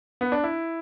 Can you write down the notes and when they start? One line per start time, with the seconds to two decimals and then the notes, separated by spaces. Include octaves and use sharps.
0.21 B3
0.32 D4
0.44 E4